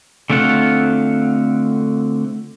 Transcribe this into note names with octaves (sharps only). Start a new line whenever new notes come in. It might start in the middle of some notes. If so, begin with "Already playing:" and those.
D3 A3 C4 F4 F#5